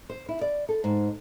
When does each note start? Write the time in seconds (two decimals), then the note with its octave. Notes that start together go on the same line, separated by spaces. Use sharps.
0.10 C5
0.29 E4
0.41 D5
0.69 A4
0.84 G#2